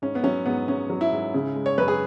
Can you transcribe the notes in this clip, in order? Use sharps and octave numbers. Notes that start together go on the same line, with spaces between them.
G#2 C#4
B3
F#3 C#4
G#2 B3
G#2 C#4
F#3
E4
G#2
C#3
G#3
C#5
F#2 B4
G#4